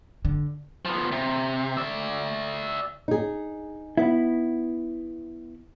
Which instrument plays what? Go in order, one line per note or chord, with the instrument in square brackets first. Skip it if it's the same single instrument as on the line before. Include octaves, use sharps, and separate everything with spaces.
[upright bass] D3
[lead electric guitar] F3 B3
C3
D5 E5
[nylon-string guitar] D#4 G#4
[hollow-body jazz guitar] B3 E4